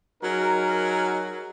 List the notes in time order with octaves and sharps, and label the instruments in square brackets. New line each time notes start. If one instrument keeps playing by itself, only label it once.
[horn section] F#3 D#4 G#4 A#4